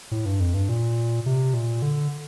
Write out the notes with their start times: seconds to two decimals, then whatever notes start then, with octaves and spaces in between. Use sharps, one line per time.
0.11 A2
0.26 G2
0.40 F2
0.54 G2
0.69 A#2
1.26 C3
1.54 A#2
1.82 D3